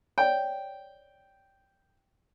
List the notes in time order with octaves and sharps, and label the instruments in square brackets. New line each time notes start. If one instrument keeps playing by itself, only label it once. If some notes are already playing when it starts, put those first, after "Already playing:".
[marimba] C#5 D5 [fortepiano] G5